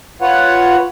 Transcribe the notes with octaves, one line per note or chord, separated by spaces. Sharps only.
F4 B4 C#5 F#5